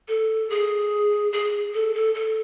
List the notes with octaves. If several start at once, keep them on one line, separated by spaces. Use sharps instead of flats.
A4
G#4
G#4
A4
A4
A4